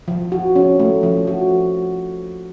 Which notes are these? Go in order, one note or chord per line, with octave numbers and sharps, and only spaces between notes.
F3
F#4
C#4
A3
F3
F#4